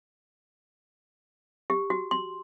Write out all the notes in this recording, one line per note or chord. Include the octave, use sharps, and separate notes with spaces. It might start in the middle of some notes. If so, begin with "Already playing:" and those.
G4
F#4
C6